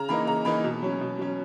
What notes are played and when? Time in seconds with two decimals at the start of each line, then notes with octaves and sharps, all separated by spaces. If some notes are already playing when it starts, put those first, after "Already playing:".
Already playing: C#3 A#5
0.09 E3 A#3 D#4 B5
0.27 C#3 A#5
0.45 E3 A#3 D#4 B5
0.64 B2
0.82 F#3 C#4
1.01 B2
1.19 F#3 C#4